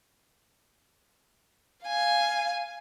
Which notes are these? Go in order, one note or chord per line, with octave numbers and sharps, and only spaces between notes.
F5 G#5